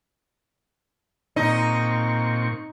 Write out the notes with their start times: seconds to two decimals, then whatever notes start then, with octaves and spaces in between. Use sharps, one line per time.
1.36 A#2 C4 D#4 C#6